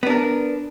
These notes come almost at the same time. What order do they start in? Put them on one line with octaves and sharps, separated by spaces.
B3 D4 A#4